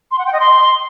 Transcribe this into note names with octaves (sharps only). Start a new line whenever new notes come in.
C6
F#5
G5
D#5
C6